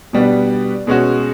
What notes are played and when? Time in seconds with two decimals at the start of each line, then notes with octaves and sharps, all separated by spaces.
0.13 B2 G3 B3 D4
0.87 B2 G#3 C#4 F#4